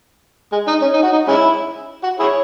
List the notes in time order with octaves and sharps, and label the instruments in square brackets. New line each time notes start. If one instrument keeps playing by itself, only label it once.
[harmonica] G#3
D#4
C#4
D#4
F#4
D#4
G#3 C#4 E4
F#4
E4 G#4 C#5